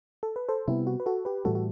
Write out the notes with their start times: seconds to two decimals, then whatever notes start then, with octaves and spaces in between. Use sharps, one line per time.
0.23 A4
0.36 B4
0.49 A4 C5
0.68 C3 G3 B3 E4
0.87 F#4
1.00 B4
1.06 F#4 A4
1.25 G4 B4
1.45 A2 E3 G3 F#4 A4
1.55 F#4